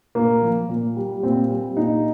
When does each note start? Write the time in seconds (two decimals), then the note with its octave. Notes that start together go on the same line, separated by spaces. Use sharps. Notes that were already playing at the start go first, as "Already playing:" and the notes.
0.15 A#2 A#3
0.42 F3
0.69 A#2
0.96 G3
1.23 A#2 C4
1.50 G3
1.76 A#2 D#4